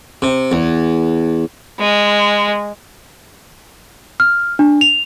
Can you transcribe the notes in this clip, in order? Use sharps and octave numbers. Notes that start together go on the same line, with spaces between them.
C3
E2
G#3
F6
D4
F7